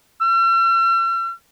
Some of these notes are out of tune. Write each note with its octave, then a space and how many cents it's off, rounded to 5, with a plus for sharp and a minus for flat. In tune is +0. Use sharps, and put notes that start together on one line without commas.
E6 +45